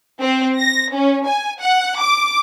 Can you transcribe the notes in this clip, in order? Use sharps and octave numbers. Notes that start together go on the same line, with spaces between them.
C4
A#6
C#4
G#5
F#5
D6